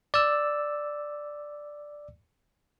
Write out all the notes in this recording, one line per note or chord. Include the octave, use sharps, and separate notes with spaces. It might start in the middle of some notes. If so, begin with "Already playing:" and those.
D5 E6